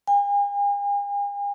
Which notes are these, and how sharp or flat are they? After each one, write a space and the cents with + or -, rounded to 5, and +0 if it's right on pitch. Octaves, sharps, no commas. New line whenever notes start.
G#5 -45